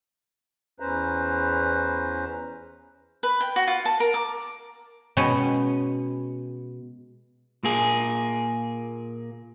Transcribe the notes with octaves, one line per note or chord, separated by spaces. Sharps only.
E2 C#4 B4 C5 A#5
B4
G5
F#4
F4
A5
A#4
D6
B2 G#3 B3 C#4 C#5
A#2 A#3 G#4